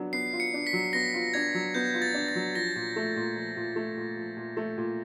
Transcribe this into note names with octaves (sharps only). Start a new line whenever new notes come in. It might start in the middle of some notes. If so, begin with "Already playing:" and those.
Already playing: F#3 B3 D4
B3 C7
F4
C#7
D4
B6
F#3
B3 A#6
F4
D4 G#6
F#3
B3 G6
F4
A6
D4
A6
F#3
F3 A#6
A#2
A3
A#2
F3
A#2
A3
A#2
F3
A#2
A3
A#2